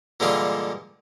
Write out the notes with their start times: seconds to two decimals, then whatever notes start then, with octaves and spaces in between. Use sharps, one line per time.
0.20 A#2 D3 E3 G3 G#3 F4